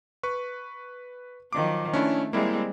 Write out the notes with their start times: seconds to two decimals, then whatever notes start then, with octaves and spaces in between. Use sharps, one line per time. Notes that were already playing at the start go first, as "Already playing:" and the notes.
0.23 B4 C#6
1.53 D#3 F3 F#3 D6
1.93 A3 C#4 D4 E4
2.33 G3 G#3 A#3 C4 E4